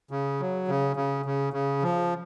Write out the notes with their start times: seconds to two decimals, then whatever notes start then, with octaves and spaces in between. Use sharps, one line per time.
0.11 C#3
0.40 F#3
0.68 C#3
0.96 C#3
1.26 C#3
1.53 C#3
1.83 F3